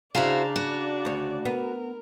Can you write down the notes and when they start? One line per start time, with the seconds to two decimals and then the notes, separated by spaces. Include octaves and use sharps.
0.15 C#3 D4 E4 F#4 C5 D5 F5 A#5
0.56 F#4
1.05 D2 C#5
1.45 B3 A#4